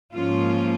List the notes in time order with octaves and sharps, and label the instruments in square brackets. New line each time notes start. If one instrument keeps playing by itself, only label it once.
[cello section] G#2 F3 A#3 C#4 F4